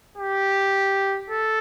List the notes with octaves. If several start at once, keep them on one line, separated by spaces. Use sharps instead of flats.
G4
A4